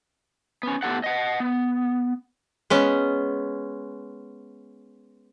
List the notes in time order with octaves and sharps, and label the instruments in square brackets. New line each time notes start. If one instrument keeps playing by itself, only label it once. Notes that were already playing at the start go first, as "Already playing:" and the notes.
[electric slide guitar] B3 C#4
A2 B3 G4 A4 F#5
D#5 F#5
B3
[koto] G#3 B3 C#4